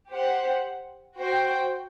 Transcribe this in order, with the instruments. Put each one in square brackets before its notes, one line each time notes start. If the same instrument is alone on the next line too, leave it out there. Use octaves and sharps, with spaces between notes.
[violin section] G4 C5 F#5
F#4 C5 G5